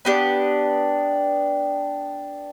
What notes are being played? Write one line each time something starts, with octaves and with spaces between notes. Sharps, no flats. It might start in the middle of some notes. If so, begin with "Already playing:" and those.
B3 D4 G4